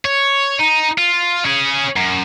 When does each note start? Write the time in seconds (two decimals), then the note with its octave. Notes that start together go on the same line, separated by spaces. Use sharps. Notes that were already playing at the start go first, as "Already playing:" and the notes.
0.05 C#5
0.59 D#4
0.98 F4
1.45 C#4 G#4
1.97 F#2